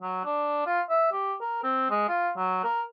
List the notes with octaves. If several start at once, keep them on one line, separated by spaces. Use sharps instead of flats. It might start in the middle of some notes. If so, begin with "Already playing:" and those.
F#3
D4
F4
E5
G4
A#4
C4
G#3
F4
F#3
A#4